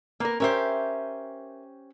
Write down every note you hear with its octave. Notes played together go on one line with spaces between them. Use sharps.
A#3 B3 A#4
C#4 G4 A#4 C5 E5